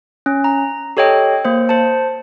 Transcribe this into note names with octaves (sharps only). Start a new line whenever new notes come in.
C#4
A#5
G4 A4 C#5 D#5 G5
A#3 C5
C5 A5